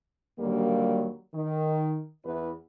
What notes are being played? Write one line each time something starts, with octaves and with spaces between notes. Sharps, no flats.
D#2 D3 F#3 G3 A#3
D#3
E2 E4 B4